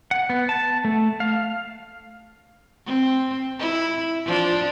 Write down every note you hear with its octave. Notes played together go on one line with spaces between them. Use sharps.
F#5
B3
A5
A3
F5
C4
E4
F3 D4